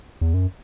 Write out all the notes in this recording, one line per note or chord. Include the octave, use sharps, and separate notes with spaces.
E2
F#2